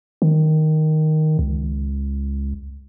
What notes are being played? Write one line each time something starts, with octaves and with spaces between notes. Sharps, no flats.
D#3
C#2